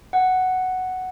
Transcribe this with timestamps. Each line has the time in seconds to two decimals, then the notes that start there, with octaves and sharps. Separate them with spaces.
0.13 F#5